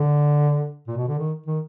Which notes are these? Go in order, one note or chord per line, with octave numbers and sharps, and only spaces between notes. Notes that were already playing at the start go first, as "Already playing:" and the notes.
Already playing: D3
A#2
B2
D3
D#3
D#3